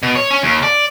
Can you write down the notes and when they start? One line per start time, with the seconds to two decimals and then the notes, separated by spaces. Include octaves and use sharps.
0.03 B2
0.15 C#5
0.31 C#4
0.43 D#2
0.63 D5